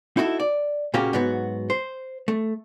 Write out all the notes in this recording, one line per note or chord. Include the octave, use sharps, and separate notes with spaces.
D#4 E4 F#4 G#4 A4
D5
A#2 C#3 A#3 C#4 F#4 G4
G#2 F#3 B3 F#4
C5
A3